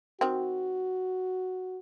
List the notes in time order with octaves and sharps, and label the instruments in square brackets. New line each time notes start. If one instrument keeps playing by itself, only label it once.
[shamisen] D#3 C4 [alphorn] F#4